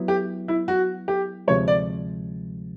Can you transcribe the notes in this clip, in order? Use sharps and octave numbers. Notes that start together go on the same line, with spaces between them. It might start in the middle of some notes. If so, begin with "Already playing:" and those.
Already playing: F#3 B3 E4
G4
E4
F#4
G4
D2 C3 F3 G#3 C#5
D5